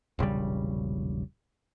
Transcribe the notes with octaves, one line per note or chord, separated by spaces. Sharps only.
E1 A#1 C#3 G3